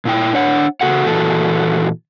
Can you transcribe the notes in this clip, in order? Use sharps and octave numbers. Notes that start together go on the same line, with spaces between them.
A#2 E4 G5
D4 C#5 F#5
C#3 F#4 A4 F#5
A#2 E3 F#4 A4